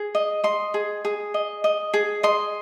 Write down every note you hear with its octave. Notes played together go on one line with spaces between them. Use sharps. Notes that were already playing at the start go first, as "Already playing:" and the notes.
Already playing: G#4
D#5
D#5 C6
G#4
G#4
D#5
D#5
G#4
D#5 C6